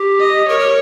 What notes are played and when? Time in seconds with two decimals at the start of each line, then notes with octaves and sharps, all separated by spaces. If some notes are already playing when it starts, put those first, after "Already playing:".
Already playing: G4
0.20 D#5
0.49 A#4 C#5
0.59 A#4